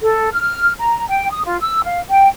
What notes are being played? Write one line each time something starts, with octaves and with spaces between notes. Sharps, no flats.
A4
F6
A#5
G5
D#6
F4
E6
F5
G5